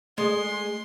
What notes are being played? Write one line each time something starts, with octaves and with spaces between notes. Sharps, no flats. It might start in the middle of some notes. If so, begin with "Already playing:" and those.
G#3 A3 C6